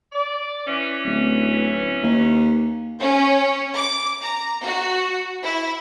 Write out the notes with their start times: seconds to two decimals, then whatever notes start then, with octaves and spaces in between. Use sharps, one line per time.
0.12 D5
0.67 E3 C#4
1.05 D1
2.03 D#2
3.00 C#4
3.75 D6
4.22 A#5
4.64 F#4
5.45 E4